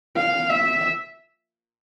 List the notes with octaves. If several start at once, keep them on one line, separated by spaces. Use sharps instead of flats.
F5
E5